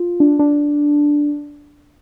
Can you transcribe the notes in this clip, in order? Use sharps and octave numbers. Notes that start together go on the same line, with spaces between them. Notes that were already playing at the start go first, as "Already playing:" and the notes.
Already playing: F4
D4
D4